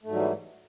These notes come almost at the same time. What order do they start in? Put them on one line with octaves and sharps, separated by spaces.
A3 G#2 F#3 G3 E3